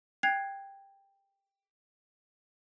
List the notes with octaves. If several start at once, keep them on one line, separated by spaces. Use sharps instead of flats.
G5 F#6 G#6 C7 F7